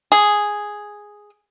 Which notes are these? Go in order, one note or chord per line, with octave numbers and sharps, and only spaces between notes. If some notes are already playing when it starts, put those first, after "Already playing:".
G#4